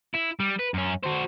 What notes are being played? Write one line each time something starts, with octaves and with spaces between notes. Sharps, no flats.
E4
G3
B4
F#2 C#4
F#4 C5